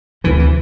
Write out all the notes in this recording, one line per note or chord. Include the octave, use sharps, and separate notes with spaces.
D2 C3 E3
E3